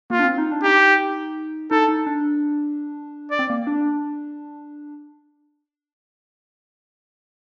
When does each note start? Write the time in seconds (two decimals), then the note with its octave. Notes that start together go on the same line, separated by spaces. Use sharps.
0.10 A#3 F4
0.20 D4
0.24 C4
0.38 D#4
0.52 D4
0.64 D#4 G4
1.71 D#4 A4
1.88 D#4
2.07 D4
3.31 D5
3.39 C4
3.50 A#3
3.67 D4